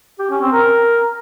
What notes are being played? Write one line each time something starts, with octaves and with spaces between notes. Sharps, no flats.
G4
C#4
C4
A#4